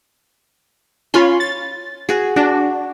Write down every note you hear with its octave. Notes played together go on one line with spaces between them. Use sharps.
C#4 F4 C#5 B5 C6
A6
F#4 G#4
D4 F#4